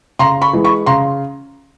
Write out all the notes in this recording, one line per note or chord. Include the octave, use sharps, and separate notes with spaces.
C#3 A#5 C6
B5 C#6
E3 G#3
B5 C#6
C#3 A#5 C6